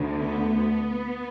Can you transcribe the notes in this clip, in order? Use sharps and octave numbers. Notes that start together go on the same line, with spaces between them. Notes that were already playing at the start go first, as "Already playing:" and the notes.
Already playing: D2 D3
B3